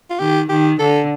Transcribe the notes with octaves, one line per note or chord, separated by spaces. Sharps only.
F4
D#3 G4
D#3 G4
D3 A4